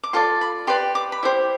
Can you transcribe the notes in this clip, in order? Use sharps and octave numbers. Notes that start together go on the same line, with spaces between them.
D6
F4 A4 D5 C6
B5
G4 B4 D5 C6
D6
B5
E4 G4 C5 C6